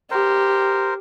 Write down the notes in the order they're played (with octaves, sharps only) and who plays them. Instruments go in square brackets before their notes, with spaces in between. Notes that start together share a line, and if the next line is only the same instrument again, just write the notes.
[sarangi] G4 [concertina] A#4 C5